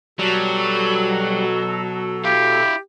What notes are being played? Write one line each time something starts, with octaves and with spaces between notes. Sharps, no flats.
B2 F#3 G3 A4
E4 G4 F5